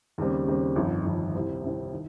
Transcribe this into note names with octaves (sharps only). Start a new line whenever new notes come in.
D#2 C#3 G3 C4
D#2 C#3 G3 C4
G1 F2 D#3
G1 F2 D#3
C2 C3 G3 C4
C2 C3 G3 C4
D#3